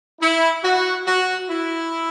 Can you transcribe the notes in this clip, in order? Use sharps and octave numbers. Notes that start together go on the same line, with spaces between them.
E4
F#4
F#4
E4